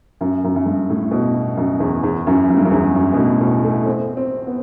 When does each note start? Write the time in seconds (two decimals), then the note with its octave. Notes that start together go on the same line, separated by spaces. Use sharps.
0.21 F#2
0.44 F#2
0.56 F#2
0.66 G2
0.90 A2
1.11 B2
1.57 F#2
1.80 E2
2.03 E2
2.27 F#2
2.50 F#2
2.57 G2
2.65 F#2
2.71 E2
2.95 F#2
3.13 B2
3.18 A2
3.41 B2
3.64 A3
3.86 C4
4.17 C4
4.47 B3